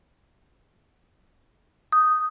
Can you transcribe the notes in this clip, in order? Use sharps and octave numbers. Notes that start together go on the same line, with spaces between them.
D#6